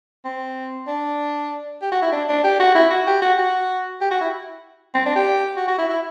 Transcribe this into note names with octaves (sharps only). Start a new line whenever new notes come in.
C4
D4
G4
F#4
E4
D4
D4
G4
F#4
E4
F#4
G4
F#4
F#4
G4
F#4
E4
C4
D4
G4
F#4
F#4
E4
E4